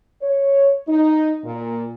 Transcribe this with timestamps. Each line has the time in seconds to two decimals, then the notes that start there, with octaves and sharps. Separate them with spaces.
0.22 C#5
0.88 D#4
1.44 A#2